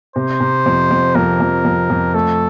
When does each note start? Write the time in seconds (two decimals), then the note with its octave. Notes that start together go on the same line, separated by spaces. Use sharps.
0.16 C3 C5
0.40 C3
0.66 F2
0.91 F2
1.15 F2 A#4
1.40 F2
1.65 F2
1.90 F2
2.14 A3 A4